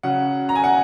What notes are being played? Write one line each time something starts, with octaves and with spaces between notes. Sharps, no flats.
C#3 F#3 C#4 F#5
A#5
G#5
F#5